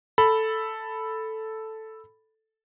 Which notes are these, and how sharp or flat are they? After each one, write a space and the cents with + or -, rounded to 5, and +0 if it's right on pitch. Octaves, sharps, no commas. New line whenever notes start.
A4 +0 B5 +0